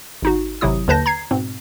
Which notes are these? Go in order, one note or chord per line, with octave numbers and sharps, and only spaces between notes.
G#1 D#4 F#4
G#1 C3 F#3 E4 D#6
D#2 D3 B4 A5 G6 A#6
A#5 G#6 C7
G#2 B2 C4